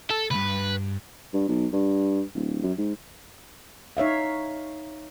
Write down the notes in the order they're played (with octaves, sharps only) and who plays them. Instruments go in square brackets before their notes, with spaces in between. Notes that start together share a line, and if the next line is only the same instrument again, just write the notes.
[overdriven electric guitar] A4
[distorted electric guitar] C#2 G2 [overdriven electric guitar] B4
[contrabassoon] G2
B1
G2
D1
F#2
G#2
[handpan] D#4 C#5 E5 F5